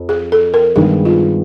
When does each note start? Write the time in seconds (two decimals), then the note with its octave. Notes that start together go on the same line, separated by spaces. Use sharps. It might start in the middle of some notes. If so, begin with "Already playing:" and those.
Already playing: F2
0.09 G#4
0.32 A4
0.54 A#4
0.76 G2 D#3 G#3 B3 G#4
1.05 F4